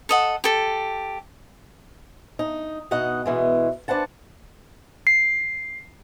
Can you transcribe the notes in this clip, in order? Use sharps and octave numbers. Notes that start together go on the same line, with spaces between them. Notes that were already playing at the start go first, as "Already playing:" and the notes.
A4 D#5 F#5
G4 A4
D#4
B2 D#4 D#5 F#5
B2 E3 G#3
D4 B4 C5 F#5 A5
C7